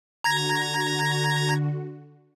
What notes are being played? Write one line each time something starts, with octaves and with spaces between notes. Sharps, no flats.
D3 F#4 A#5 G#6 A#6